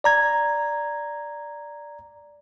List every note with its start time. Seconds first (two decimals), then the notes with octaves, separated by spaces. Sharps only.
0.04 D5 A#5 G#6